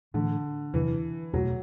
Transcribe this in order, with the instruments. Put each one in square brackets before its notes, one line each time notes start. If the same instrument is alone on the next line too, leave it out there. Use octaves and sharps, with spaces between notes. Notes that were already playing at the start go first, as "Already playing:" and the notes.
[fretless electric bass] A2 E3 A3 D4 [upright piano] D3
[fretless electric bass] E2 C3 F#3 [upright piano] E3
[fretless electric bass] E2 B2 A3 [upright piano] F#3